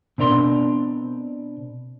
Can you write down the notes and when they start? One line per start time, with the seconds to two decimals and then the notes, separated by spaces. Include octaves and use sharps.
0.18 B2 C4 D4 A#4 C6